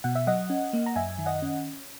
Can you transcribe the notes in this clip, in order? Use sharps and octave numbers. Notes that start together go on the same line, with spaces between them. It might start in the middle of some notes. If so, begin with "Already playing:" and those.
B2 F#5
E5
F#3 D#5 F#5
C#4
A#3
A#5
F#2 E5 G#5
D#3
D#5 F#5
C#4